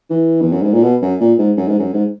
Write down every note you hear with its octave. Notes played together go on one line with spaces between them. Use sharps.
E3
E2
F#2
G#2
A#2
B2
F#2
A#2
G#2
F#2
G#2
F#2
G#2